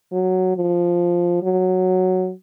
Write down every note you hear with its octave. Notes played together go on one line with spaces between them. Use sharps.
F#3
F3
F#3